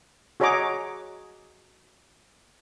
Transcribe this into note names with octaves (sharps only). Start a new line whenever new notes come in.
F#4 G#4 C#5 D#5 A#5 D6